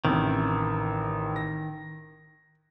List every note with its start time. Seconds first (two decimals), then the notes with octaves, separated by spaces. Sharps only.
0.05 A1 C3 D#3
1.36 A#6